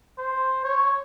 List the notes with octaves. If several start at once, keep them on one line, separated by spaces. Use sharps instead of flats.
C5
C#5